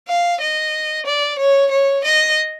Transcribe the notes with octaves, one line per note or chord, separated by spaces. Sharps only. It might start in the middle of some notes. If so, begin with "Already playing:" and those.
F5
D#5
D5
C#5
C#5
D#5